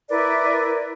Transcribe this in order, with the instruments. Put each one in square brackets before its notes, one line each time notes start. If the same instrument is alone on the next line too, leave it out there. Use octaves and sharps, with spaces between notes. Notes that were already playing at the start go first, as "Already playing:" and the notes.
[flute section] E4 A#4 B4 D5